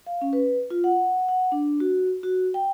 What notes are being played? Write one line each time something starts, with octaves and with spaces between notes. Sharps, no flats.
F5
C#4
B4
F4
F#5
F#5
D4
F#4
F#4
G5